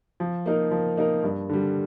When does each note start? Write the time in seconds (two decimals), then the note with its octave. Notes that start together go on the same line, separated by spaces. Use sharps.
0.20 F3
0.46 A#3 D#4 A#4
0.71 F3
0.97 A#3 D#4 A#4
1.23 G2
1.49 D3 G3